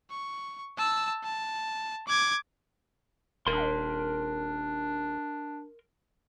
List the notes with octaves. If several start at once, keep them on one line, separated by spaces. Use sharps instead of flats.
C#6
A5 E6
A5
D6 G#6
D#1 D4 A#4 C6